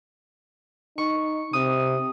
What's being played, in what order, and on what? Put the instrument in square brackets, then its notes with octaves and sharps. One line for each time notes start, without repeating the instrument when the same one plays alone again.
[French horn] D#4 [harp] C#6
[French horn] C3 [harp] D#6